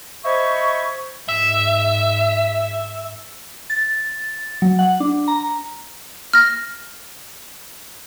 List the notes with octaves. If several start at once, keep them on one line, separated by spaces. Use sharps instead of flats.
C5 D#5 E5 G#5 B5 C#6
G#2 E5
A6
F#3
F#5
D4
A#5
F6 A#6